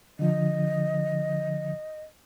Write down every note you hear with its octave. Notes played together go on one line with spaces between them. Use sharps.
D3 F3 D#5